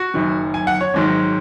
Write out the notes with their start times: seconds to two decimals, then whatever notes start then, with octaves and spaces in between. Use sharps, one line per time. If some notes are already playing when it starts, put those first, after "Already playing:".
Already playing: F#4
0.14 F#1 F#2 D#3
0.54 G#5
0.67 F#5
0.81 C#5
0.94 G#1 G#2 D#3 F#3